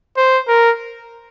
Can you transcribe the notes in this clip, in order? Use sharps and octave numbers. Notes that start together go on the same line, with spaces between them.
C5
A#4